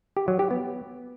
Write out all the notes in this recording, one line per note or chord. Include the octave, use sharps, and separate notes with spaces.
G4
F#3
G4
B3